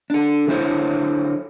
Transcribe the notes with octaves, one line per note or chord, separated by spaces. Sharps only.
D4 A4
D3 F#3 B3 E4 C5 C#5